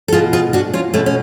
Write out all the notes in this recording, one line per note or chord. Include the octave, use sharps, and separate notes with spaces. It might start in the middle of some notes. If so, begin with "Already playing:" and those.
A4
B2 F4 G#4
F4 G#4
D4 F#4
C#4 F4
B2 A3 C#4
C#4